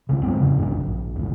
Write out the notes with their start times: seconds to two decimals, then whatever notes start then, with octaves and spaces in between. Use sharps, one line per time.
0.09 C2 C#3
0.23 G#2 F#3 B3 C4
0.39 F2 C#3
0.57 D#1 B1 G#2 D4
0.80 A#1
1.16 A1 D#2